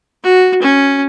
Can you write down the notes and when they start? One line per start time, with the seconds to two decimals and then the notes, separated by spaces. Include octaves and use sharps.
0.24 F#4
0.62 C#4